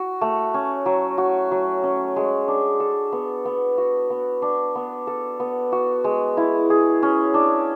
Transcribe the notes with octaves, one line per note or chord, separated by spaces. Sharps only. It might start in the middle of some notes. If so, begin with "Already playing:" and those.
Already playing: F#4
A3
C#4
F#3
F#4
F#3
C#4
G#3
D4
A4
B3
B3
F#4
B3
D4
B3
A4
B3
F#4
G#3
E4
G#4
C#4
D4